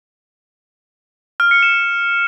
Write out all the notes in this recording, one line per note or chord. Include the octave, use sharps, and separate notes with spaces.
F6
C#7
E7